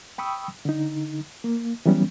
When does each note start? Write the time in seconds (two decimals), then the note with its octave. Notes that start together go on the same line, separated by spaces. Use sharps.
0.18 G5 B5 C#6 D#6 E6
0.65 D3 D#4
1.44 A#3
1.86 E3 F#3 G3 B3 C#4